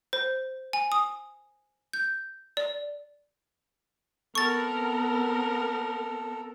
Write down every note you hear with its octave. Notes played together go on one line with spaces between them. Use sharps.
C5
G#5
D#6
G6
D5
B3 C4 A4 A#4 C#6 A6